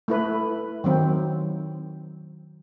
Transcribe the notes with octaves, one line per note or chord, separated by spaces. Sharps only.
A3 E4 B4
D#3 F#3 C4